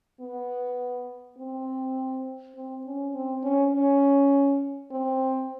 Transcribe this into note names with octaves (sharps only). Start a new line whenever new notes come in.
B3
C4
C4
C#4
C4
C#4
C#4
C4